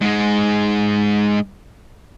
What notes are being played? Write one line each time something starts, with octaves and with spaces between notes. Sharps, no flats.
G#2 G#3